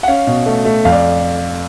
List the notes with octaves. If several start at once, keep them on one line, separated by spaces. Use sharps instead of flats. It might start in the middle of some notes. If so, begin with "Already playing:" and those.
F#5
C#4 F5
B2
A3
A3
F2 F5
D5